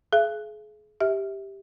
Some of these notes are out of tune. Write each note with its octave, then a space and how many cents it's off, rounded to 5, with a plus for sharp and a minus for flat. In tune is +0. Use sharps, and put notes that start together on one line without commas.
G#4 +35 E5 +45
G4 +0 E5 -20